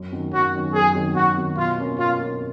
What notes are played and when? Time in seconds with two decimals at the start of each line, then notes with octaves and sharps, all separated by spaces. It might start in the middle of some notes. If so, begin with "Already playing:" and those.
Already playing: F#2
0.12 D#3 F#3 C#4
0.32 F#2 F#4
0.53 D#3 F#3 C#4
0.74 F#2 G#4
0.95 D#3 F#3 C#4
1.16 F#2 F#4
1.37 D#3 F#3 C#4
1.57 B2 F4
1.78 A#3 C#4
1.99 B2 F4
2.19 A#3 C#4